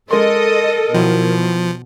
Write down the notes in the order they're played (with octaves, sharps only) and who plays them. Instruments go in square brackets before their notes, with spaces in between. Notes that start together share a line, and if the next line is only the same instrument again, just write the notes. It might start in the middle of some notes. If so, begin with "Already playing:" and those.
[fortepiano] G#3 C6 [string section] A4 D#5 [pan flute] A#4
[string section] B2 [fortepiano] D#3 F#3 E4 [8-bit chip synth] F3